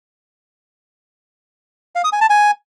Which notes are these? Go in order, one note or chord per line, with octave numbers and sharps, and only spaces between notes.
F5
D#6
G#5
A5
G#5